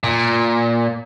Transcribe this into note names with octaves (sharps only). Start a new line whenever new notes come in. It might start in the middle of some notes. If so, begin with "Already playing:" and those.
A#2